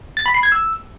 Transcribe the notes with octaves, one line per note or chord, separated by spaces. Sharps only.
A6
B5
C7
G#6
E6